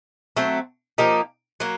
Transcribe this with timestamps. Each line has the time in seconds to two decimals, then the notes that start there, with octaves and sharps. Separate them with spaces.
0.37 F#3 A3 C4
0.98 F3 A#3 D#4 G4
1.60 F#3 A#3